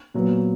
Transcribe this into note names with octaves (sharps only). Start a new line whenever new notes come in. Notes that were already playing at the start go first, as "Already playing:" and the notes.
A#2 F#3 B3